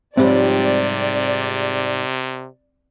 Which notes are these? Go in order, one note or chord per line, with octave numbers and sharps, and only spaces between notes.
G#2 C3 F3 G3 C4 D5